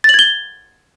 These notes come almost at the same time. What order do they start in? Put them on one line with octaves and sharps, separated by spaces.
A6 F#7 G#6 G7